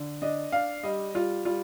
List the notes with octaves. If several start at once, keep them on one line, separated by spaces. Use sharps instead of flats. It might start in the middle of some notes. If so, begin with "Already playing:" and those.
Already playing: D3
D4 D#5
D4 F5
G3 D#5
G3 F4
G3 F4